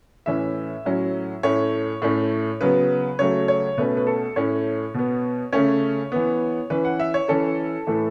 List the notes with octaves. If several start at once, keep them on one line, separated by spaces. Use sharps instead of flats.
A2 E3 C#4 E5
A2 F#3 C#4
A2 A3 C#4 C#5
A2 A3 C#4
C#3 F#3 B3 B4
C#3 F#3 A3 C#5
C#5
B2 A3 C#4 B4
B4
A4
A2 A3 C#4 C#5
B2 B3
C#3 A3 C#4 C#5
E3 B3
E3 C#4 B4
F#5
E5
C#5
E3 C#4 A4
A2 E3 A3